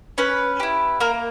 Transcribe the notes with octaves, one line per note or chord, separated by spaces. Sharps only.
C#4 B4
E4 G4
A#3 A#4